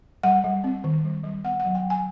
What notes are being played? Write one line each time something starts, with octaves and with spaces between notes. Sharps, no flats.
G3 F#5
G3
C4
D#3
G3
G3
B3 F#5
F#3 F#5
G5
F#3
G#5